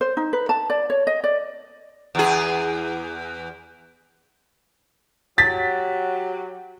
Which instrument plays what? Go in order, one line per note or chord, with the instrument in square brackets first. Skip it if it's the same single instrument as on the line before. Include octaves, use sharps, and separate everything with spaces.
[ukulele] C5
D#4
B4
A5
D5
C#5
D#5
D5
[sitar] E2 G#4
[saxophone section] F#3 G4 [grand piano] A6 B6